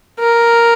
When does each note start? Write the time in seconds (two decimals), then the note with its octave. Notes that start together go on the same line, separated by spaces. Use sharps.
0.20 A#4